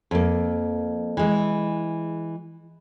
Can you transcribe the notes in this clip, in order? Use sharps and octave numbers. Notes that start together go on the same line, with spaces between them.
F2 A#3
E3 G#3